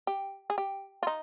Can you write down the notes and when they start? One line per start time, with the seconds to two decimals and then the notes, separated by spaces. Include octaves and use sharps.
0.07 G4
0.50 G#4
0.58 G4
1.03 F4
1.07 D#4